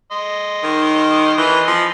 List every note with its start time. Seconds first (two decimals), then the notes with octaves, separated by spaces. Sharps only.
0.12 D#5 C6
0.63 D#3
1.37 E3
1.67 F3